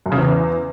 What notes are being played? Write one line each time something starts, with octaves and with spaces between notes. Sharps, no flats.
F#2
C#3
E2